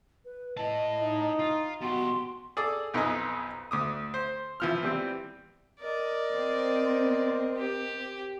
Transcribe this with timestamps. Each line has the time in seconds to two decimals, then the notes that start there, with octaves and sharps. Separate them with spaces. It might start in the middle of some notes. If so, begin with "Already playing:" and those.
0.25 B4
0.57 E4 D#5 A5
1.03 D#4
1.39 F4
1.81 B2 F#4 G4 C6
2.57 G#4 A4 D5
2.94 B1 F2 D#4 B4 D#5 G#5
3.71 D2 D6 D#6
4.14 C5
4.60 E3 F3 F6
4.83 E3 G3 C4
5.81 A#4 D5 D#5
6.31 C4
7.58 G4